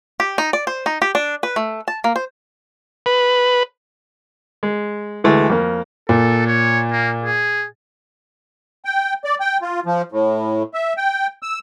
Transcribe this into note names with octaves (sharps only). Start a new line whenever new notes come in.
G4
D#4
D5
C5
D#4
G4
D4
B4
A3
A5
A#3
C5
B4
G#3
D2 E3 G#3 A3
F2 A#3
A#2 A4
C#5
A#3
G#4
G5
D5
G5
F4
F3
A2
E5
G5
E6